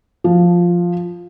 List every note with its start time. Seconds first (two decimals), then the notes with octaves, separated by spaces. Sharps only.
0.24 F3